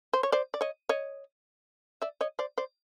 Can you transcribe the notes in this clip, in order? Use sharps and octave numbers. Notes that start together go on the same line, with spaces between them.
C5
C#5
C5 D5
D5
C#5 D#5
C#5 D#5
D5 E5
C#5 D#5
C5 D5
C5 D5